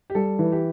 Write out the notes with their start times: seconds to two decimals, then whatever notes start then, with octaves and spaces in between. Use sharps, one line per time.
0.10 G4
0.15 G3 A4
0.39 E3
0.52 G4